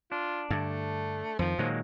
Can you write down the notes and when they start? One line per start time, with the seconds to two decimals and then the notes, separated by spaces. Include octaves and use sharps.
0.12 D4 F4
0.50 G2 D3 A3
1.39 F2 D#3 F3
1.59 A#2 D#3 F#3 G#3 A#3